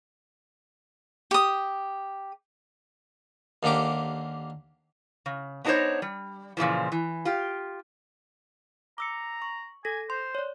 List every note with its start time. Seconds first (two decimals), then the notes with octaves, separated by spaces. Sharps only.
1.31 G4 D#6
3.63 D#2 D3 A#3 G4 D6
5.26 C#3
5.65 B3 D4 D#4 F#4 C5 C#5
6.02 G3
6.57 A#2 C#3 E3 F3
6.92 E3
7.25 F4 G4
8.98 A#5 D6 E6 C#7
9.42 C#6
9.85 A4 G#5 A#6
10.10 C5 C6
10.35 C#5 D5